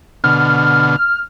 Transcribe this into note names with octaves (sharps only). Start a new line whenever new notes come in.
B2 D3 F6